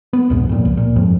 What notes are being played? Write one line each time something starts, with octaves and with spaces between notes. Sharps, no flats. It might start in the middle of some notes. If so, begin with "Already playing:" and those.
B3
C2 F2 G#2 B2
F2 A#2
C#2
A#2
F#1 F2 G#2 F3